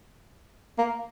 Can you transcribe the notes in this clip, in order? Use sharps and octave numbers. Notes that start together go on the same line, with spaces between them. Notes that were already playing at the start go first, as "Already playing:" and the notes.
A#3